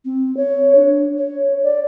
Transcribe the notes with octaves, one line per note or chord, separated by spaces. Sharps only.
C4
C#5
D4
C#5
D5